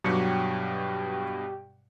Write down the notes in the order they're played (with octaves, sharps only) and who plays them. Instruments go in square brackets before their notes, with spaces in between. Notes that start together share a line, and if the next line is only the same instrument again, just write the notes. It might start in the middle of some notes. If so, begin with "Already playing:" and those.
[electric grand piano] G2 B2 [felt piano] F#3 C#7 [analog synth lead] G4